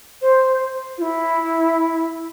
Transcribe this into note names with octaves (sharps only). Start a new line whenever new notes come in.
C5
F4
E4